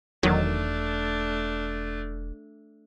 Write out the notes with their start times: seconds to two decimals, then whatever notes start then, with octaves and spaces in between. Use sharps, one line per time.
0.23 E1 E2 D#3 F#3 A3 D4